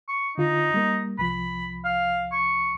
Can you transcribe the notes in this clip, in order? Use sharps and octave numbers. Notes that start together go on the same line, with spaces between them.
C#6
D3 D#4 F4
G3 A#3
C2 F3 B5
F5
C#6